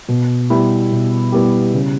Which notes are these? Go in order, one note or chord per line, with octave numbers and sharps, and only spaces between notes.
B2
G3 B3 E4 G4
B2
G3 B3 E4 G4
C#3